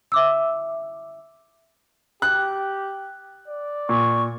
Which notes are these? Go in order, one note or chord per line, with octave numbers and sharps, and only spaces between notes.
E5 D6 E6
G4 F#6
D5
A#2 C#6